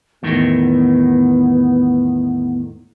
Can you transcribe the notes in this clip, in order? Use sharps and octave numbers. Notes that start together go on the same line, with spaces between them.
E2 A2 D#3 B3